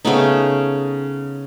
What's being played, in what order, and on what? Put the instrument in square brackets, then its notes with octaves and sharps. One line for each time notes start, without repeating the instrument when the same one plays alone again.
[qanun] C#3 A3 B3 D#4